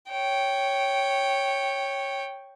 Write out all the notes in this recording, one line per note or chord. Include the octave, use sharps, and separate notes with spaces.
C#5 G5